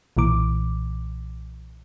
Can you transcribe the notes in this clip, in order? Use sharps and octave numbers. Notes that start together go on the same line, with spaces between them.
B1 A#2 E3 D6